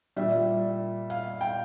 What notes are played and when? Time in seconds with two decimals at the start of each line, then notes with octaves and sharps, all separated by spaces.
0.17 A#2 G3 E5
1.10 F5
1.41 G5